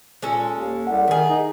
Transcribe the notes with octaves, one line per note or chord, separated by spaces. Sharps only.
A#2 G#3 C#4 A4
D#2
C2 F#5
D#3 A3 G#4
D#4